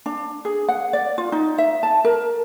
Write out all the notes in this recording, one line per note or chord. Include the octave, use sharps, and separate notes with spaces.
D4
G#4
F#5
D5
F4
D#4
E5
A5
A#4